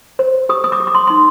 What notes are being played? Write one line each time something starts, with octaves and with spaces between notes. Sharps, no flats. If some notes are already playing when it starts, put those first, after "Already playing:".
C5
G4 D#6
D#6
D6
G4
D6
C6
D#4 C6